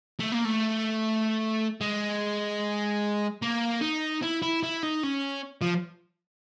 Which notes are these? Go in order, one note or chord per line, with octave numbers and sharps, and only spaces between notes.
A3
A#3
A3
G#3
A#3
D#4
E4
E4
E4
D#4
C#4
F3